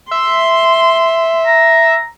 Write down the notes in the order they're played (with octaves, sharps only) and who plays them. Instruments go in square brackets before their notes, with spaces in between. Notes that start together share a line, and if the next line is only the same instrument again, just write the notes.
[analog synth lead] E5 [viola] C6
[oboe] A#5